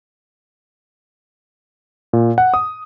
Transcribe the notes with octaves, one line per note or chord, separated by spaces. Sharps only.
A#2
F#5
D#6